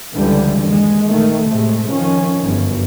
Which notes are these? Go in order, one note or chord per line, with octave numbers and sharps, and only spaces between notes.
C#2 G2 D3 E3 G3
D#2 G#3
A#1 D#3 A3
A2 C3 G#3 A3
F2 D#3 F3 C#4
G1 F#2